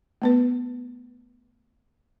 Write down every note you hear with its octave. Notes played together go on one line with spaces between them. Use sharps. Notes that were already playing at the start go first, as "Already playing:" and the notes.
A3 B3 B4